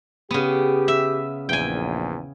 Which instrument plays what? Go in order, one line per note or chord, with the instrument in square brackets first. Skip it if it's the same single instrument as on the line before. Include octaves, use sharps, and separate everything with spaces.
[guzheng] C#3 B3 [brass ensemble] G4
[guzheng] E5
[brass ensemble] A#1 E2 [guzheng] G5 G#5